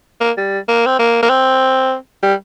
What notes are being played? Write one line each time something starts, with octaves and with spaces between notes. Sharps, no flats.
A#3
G3
A#3
C4
A#3
A#3
C4
G3